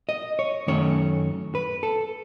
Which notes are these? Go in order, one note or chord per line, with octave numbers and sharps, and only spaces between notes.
D#5
C#5
F#2 D#3 A3 C#4 C#5
B4
A4